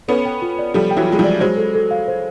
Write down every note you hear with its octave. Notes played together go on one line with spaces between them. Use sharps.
B3 C#4 A4
G5
F4
D5
F3 G3 A4
G5
E3 F#3
G#3 F4
F3 G3
D5
F#3 G#3 C5
A4
A4
F5
C5